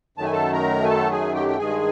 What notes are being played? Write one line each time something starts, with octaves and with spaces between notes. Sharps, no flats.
F#2 D#3 F#3 A3 A5
G#5
A4 A5
A#4 A#5
G#5
A4 A5
G#4 G#5
G4 G5
G5
G2 D#3 G#3 G#4 G#5